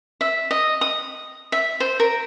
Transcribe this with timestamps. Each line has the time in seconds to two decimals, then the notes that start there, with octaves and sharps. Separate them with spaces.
0.21 E5
0.51 D#5
0.81 D#6
1.52 E5
1.80 C5
2.00 A#4